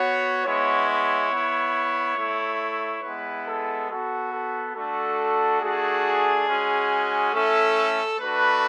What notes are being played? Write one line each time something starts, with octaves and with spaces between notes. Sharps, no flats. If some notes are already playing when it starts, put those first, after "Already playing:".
Already playing: B3 F#4 C#5
G#3 B3 E4 C#5
C#5
B3 E4
A3 E4
G#3 B3 E4 B4
A4
B3 F#4 A4
A4
A3 D4 F#4 A4
A3 D4 F#4 G#4
G#3 C#4 F#4
A3 C#4 E4 A4
A3 D4 F#4 B4